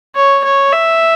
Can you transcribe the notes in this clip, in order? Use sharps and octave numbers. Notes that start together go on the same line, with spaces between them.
C#5
C#5
E5